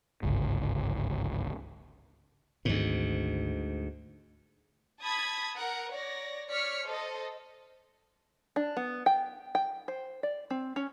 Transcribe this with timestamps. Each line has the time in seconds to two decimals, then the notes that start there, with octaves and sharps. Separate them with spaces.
0.23 G1 C#2 G#2
2.65 G#1 D2 G#2
5.01 A5 B5 D#6 G#6 B6
5.56 A#4 F#5
5.92 C#5 D5 A#6
6.49 C#5 D5 F6 B6 C#7
6.86 A4 C5 D#5
8.56 D4
8.77 B3
9.06 G5
9.55 G5
9.88 C5
10.23 D5
10.51 C4
10.76 C#4